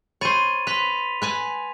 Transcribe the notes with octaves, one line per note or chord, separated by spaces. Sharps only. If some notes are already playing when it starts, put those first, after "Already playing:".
C5 C#5 B5 A6 D#7
B4 C6 B6 F7
B4 G#5 A5